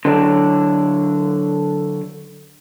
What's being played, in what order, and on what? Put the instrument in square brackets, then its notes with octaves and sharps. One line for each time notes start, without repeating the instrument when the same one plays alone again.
[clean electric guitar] D3 F#3 D4